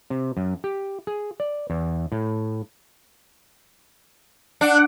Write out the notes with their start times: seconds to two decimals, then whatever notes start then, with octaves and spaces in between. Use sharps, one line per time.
0.10 C3
0.37 F#2
0.64 G4
1.07 G#4
1.40 D5
1.70 E2
2.12 A2
4.61 D4 F#5